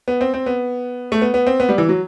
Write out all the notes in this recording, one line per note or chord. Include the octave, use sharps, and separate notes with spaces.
B3
C4
C4
B3
A3
B3
B3
C4
B3
G3
E3
F#3